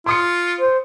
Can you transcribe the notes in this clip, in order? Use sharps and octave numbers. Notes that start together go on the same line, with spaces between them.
F4 C6 D#6 C#7
C5